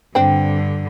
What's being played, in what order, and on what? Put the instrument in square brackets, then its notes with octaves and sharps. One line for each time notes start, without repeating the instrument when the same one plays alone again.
[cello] G2 D3 [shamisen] C4 D4